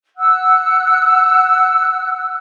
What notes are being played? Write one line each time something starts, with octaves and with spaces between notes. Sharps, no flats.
F#5 E6 F#6